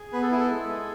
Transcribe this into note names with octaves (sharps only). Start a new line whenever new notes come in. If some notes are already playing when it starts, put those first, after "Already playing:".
Already playing: G#4
B3 B4
A4
E4 G#4
A4
G#3
G#4